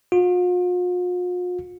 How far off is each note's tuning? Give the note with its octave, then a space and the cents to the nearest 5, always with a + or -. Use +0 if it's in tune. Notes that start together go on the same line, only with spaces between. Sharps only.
F4 +45